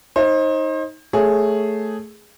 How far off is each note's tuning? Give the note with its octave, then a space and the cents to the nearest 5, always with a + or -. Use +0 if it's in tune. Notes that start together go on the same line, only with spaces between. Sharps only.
D#4 +15 C5 +35
A3 +0 G#4 +0 C#5 +0